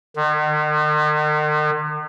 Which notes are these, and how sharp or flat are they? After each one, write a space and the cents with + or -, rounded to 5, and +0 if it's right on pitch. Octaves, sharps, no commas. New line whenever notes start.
D#3 -45